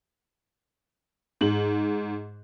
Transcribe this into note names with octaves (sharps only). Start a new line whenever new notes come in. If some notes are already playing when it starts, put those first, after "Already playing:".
G#2 F#7